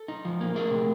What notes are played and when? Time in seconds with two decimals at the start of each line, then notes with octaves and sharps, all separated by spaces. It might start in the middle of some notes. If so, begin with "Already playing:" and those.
Already playing: A4
0.08 D#4
0.25 F3
0.41 A#3
0.55 A3 G#4 A#4
0.70 C3